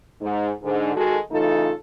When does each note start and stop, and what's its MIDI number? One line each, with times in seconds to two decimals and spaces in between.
0.20 0.49 44
0.63 0.92 44
0.63 0.92 50
0.94 1.16 51
0.94 1.16 56
0.94 1.16 66
0.94 1.16 69
1.30 1.70 49
1.30 1.70 52
1.30 1.70 57
1.30 1.70 63
1.30 1.70 65
1.30 1.70 69